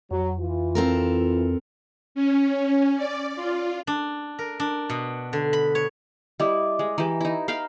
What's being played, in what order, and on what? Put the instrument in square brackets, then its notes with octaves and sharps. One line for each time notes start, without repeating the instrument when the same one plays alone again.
[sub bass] F2 [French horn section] F#3
[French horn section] E3 F4
[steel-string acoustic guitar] C4 A4 A#4
[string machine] C#4
D5
F4
[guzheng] D4
A#4
D4
B2
D3
B5
C#5
[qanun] G3 E4 [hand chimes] D#5 D6 D#6
[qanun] G#3
[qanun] E3 G4 [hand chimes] A#5
[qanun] D#4 E4
[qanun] F5 G5 B5 [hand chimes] A#5